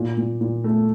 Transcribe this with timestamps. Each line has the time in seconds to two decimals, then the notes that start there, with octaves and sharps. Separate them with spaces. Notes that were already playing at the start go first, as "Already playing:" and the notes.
Already playing: A#2
0.17 A#2
0.41 A#2
0.64 A3